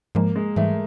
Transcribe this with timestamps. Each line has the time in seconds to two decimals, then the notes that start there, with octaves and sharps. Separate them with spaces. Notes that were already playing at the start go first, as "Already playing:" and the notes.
0.15 G#2 F3 G#3 A#3
0.36 G#3
0.56 G#2 E3 G3 A3